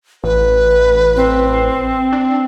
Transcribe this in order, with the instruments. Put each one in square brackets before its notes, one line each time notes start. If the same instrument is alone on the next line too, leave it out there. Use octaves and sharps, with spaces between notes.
[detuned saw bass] A1 [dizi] B4
[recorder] C4
[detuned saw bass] D4